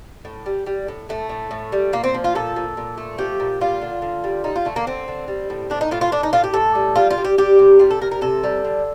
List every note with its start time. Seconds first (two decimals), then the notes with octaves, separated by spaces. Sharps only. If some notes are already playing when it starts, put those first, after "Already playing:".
0.25 A2
0.46 G3
0.66 G3
0.88 A2
1.09 A2 A3
1.29 A2
1.51 A2
1.72 G3
1.93 A#2 A#3
2.04 C4
2.14 F3
2.24 F4
2.35 A#2 A4
2.56 A#2
2.77 A#2
2.98 A3
3.18 F3 G4
3.40 A#2
3.61 G3 F4
3.81 D3
4.02 D3
4.24 G3
4.44 G3 D#4
4.56 F4
4.65 D3 A3
4.76 A#3
4.87 D3 C4
5.08 D3
5.28 G3
5.50 A2
5.70 A2 D4
5.81 D#4
5.91 A2 F4
6.01 F4
6.12 A2 D4
6.23 D#4
6.33 A2 F4
6.44 G4
6.54 A2 A4
6.75 G3
6.96 G3 F4
7.11 F4
7.18 G3
7.24 G4
7.38 G3 G4
7.59 C3
7.79 G3 F4
7.91 A4
8.01 C3 A#4
8.11 A#4
8.21 C3 A4
8.44 G3
8.64 D3